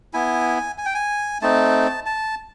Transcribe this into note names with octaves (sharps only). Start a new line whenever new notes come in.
B3 E4 G#5
G#5
G5
G#5
A3 C4 D#4 A5
A5